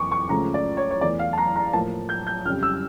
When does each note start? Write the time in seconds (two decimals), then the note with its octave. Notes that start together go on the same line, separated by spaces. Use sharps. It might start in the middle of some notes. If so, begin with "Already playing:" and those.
Already playing: F2 E3 A#3 C#6 D6
0.12 C#6
0.29 C#2 C#3 F3 A3 A#5
0.54 D5
0.77 C#5
0.91 C#5
1.01 E2 E3 A3 D5
1.19 F5
1.33 A5
1.38 A#5
1.56 A#5
1.73 A2 F3 A#3 A5
2.09 G6
2.27 G6
2.45 F2 C#3 G3 F6
2.63 E6